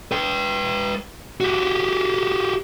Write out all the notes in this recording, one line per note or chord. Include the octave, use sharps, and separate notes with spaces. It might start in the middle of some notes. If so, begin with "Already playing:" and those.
B4 G5
F#4 G4